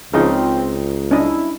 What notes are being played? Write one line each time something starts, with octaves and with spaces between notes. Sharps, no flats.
C#2 C#3 F3 C4 D#4
C#4 D4 E4 D#5